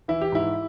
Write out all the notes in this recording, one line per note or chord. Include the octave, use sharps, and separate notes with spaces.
E3 E4
G4
G#2 E4